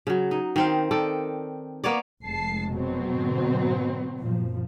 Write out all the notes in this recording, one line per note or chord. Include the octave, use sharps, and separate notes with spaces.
C#3 F#3
D#4
D#3 C4 F5
D#3 A4 D5
A#3 B3 C#5 D5
F1 G#3 A5 C7
B2 F#3 C4
G#2 D3
F#2 A#2 F3